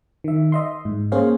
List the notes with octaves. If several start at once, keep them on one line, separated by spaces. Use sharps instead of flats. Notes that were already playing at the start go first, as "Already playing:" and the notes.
D#3 E5
D#5 E5 C6
G#2
A#3 C#4 G#4 C5 C#5 F5